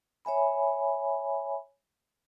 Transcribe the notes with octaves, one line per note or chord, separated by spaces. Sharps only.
C#5 E5 G#5 B5